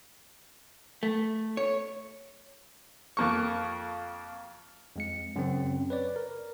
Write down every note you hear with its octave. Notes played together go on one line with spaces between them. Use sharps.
A3
C#5
F2 A#3 C#6
F2 G#3 C#7
F#2 C#3 C4
B4 C#5 D5
A#4